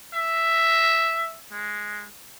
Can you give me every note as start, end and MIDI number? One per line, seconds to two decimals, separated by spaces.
0.14 1.37 76
1.52 2.06 56